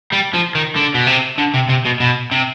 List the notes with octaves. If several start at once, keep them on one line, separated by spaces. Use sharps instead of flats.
G3
F3
D#3
D3
B2
C3
D3
C3
C3
B2
B2
C3